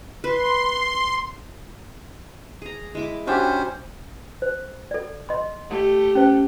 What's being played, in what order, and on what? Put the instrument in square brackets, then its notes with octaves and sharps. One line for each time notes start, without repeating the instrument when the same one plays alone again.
[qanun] B4 [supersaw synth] C6
[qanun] G#4 A#5
G#3 E4 D6
[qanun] G3 D4 E5 [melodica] C#4 C5 [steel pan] F#4 G4
[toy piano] C5
A4 D5
D#5 C6
[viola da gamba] A3 G4 A4
[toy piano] C#4 C5